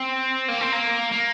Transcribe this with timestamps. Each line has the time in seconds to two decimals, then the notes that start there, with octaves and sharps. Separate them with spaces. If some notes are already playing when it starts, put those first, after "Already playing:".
Already playing: C4
0.48 A#3
0.61 C4
0.73 A#3
1.12 A#3